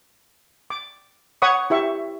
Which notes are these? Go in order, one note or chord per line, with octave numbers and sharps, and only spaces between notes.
D6
C#5 F#5 B5 C#6 D#6
E4 G4 E5 C#6